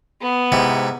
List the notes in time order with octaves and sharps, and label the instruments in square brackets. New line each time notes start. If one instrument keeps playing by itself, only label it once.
[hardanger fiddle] B3
[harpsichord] G#2 C3 E4